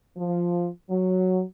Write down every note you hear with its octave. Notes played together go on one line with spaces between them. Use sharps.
F3
F#3